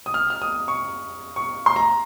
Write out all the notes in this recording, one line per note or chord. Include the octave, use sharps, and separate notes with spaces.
D#6
F6
F6
D#6
C#6
C#6
C6
A#5